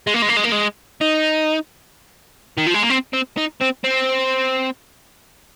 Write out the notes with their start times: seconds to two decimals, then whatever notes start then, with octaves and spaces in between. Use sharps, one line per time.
0.07 G#3
0.14 A#3
0.22 G#3
0.28 A#3
0.37 G#3
0.44 A#3
0.52 G#3
1.01 D#4
2.58 D#3
2.67 F3
2.74 G#3
2.83 A#3
2.90 C4
3.13 C4
3.38 D#4
3.61 C4
3.84 C4